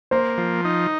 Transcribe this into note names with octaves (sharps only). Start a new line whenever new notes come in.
A#3 C5
F3
D#4